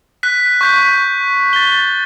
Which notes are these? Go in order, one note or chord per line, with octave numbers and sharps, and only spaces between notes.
F#6 B6
C#6 G6 B6
A6 G7